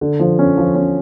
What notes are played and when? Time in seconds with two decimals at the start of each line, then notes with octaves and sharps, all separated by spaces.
0.01 D3
0.19 F3
0.39 C#4
0.58 F3
0.75 C#4